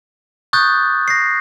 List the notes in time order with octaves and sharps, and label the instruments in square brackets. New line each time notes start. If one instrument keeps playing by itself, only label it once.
[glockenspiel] C#6 D#6 F#6 G6 A6
A#6 C7